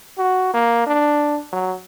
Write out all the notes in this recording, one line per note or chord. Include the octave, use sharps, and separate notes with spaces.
F#4
A#3
D4
F#3